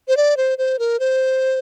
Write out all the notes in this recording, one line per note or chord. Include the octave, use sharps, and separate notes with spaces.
C5
D5
C5
C5
A#4
C5